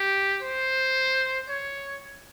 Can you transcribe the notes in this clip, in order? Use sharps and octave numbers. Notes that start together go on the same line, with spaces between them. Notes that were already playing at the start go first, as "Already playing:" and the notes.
Already playing: G4
C5
C#5